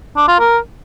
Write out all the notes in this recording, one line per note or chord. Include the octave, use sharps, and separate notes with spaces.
D4
F4
A#4